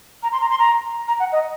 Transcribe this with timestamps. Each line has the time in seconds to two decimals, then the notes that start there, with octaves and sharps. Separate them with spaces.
0.22 A#5
0.32 C6
0.41 A#5
0.50 C6
0.59 A#5
1.07 A#5
1.19 F#5
1.32 D#5